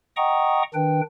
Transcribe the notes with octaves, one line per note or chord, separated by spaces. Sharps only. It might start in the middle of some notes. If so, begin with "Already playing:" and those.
D#5 F#5 G5 A#5 C#6 D#6
D#3 D4 B4 G5